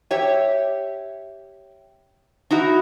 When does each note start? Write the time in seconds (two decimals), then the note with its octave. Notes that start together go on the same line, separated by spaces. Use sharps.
0.11 G4 C#5 E5
2.51 D#4 E4 F#4